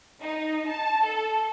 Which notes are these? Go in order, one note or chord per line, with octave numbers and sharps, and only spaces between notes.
D#4
A5
A4